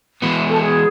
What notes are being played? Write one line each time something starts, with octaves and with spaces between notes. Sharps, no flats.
E3 G#3 B3
A4
G#4